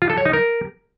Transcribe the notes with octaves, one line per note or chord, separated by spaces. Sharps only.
F4
A4
C#5
D#4
A#4